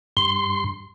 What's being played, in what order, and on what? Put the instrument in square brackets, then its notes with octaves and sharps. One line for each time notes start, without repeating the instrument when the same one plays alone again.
[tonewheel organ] G2 C6